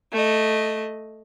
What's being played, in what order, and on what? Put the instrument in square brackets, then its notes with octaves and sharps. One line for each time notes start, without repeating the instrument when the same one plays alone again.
[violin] A3 D#5